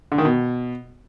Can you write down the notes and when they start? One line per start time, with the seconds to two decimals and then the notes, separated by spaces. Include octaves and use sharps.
0.12 D3
0.18 D#3
0.25 B2